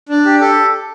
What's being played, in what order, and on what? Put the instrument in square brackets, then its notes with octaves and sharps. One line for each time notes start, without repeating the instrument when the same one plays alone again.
[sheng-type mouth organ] D4
G4
A4